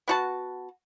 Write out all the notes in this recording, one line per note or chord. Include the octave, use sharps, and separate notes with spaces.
B3 F#4 A5